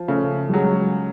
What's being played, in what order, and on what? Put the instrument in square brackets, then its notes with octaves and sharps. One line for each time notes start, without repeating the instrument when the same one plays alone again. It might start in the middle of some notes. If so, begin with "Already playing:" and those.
Already playing: [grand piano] F3
[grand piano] C#3 [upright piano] A3
[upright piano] G3
[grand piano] F#3 [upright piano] G#3